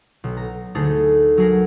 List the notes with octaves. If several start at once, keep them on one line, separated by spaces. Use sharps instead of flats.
B1
A#5
D2 A3 D#4 G#4 A6
F#3 G#4 A#4